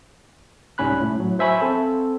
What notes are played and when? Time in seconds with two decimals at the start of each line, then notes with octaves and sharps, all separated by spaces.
0.78 C2 G#2 G3 C#4 B5 F#6
1.01 A2
1.20 F#3
1.39 C5 E5 G#5 B5 C#6
1.62 C4 A4